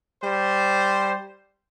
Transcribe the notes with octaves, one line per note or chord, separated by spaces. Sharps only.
G3 C5